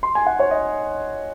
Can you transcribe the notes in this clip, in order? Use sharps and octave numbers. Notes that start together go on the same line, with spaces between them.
C6
G#5
F#5
C#5
D#5